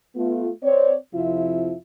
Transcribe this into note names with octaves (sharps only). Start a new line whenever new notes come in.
A3 B3 F4
C4 C#5 D5
F2 C3 F3 E4 F4 E5